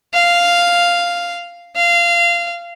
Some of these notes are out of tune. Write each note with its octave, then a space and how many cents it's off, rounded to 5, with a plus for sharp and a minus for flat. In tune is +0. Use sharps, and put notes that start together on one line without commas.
F5 -5
F5 -20